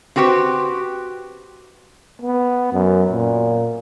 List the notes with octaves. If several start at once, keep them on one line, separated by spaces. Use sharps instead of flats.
C4 F#4 G4 B4 C5
B3
F#2
A#2